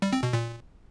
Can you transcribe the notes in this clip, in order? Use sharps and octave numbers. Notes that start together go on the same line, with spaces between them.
G3
C4
B2
A#2